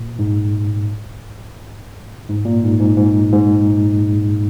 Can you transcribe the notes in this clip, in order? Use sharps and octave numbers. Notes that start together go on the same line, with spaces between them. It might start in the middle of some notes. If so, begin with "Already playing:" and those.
Already playing: A#2
G#2
G#2
A#2
G#2
G#2
G#2
G#2